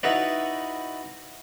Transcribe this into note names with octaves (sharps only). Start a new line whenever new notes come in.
D#4 E4 F#4 B4 D5